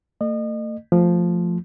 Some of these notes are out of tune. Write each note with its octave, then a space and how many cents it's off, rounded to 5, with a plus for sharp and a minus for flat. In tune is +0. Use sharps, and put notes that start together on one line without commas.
A3 +40 D#5 -35
F3 +0 A3 +15